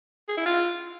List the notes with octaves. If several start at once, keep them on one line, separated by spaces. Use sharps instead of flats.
G#4
E4
F4